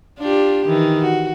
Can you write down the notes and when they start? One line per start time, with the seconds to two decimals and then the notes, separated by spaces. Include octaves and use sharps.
0.19 D4 F4 G4
0.66 D#3 E3
1.02 F#4